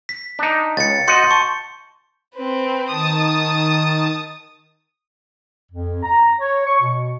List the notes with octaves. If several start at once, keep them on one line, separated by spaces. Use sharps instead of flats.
B6
D4 D#4
C#2 A6 C#7
F#4 D#5 F#5 C6 G6 C#7
A5 C#6
C4 B4
D#3 A5 D#6
F2
A#5
C#5
C#6
B2